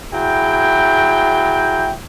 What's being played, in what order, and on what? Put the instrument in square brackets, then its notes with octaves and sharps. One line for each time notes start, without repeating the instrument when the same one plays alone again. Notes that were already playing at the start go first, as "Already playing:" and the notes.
[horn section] F#3 E4 G#4 G5